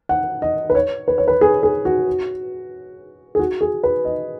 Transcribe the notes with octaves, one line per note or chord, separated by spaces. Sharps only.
F#5
D#5
B4
C#5
B4
C#5
B4
G#4
G#4
F#4
G#4
F#4
G#4
B4
D#5